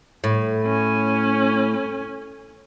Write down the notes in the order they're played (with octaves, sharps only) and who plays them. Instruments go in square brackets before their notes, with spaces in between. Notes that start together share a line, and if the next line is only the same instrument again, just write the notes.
[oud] A2
[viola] C#4 G#5